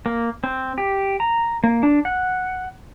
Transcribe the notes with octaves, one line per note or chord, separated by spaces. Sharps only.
A#3
C4
G4
A#5
A#3
D4
F#5